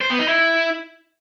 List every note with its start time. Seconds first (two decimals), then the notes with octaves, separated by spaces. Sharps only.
0.01 C5
0.10 B3
0.19 D#4
0.28 E4